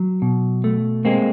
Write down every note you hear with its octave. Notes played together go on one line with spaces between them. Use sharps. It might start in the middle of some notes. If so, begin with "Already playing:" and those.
Already playing: F#3
B2
A3
G#3 A#3 C4